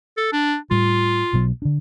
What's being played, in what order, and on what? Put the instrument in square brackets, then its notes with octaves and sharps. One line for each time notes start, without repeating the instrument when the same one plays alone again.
[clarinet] A4
D4
[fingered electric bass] A2 G3 [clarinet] F4
[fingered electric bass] B1 B2 F#3
D3 D4